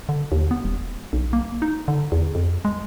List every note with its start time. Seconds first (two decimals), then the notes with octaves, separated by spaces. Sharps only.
0.09 D3
0.32 D#2
0.51 B3
0.64 E1
1.13 B1
1.33 A#3
1.62 D#4
1.88 D3
2.12 E2
2.35 F2
2.65 G#3